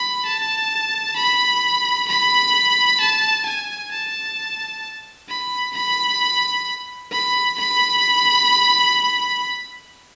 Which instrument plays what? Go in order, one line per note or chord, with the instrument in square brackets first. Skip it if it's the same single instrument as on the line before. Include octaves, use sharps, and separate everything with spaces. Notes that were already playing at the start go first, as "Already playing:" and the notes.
Already playing: [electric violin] B5
A5
B5
B5
A5
G#5
A5
B5
B5
B5
B5